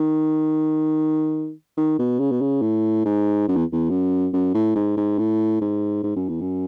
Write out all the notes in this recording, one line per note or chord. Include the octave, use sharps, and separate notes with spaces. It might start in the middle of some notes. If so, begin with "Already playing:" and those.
Already playing: D#3
D#3
B2
C#3
B2
C#3
A2
G#2
F#2
E2
E2
F#2
F#2
A2
G#2
G#2
A2
G#2
G#2
F#2
E2
F#2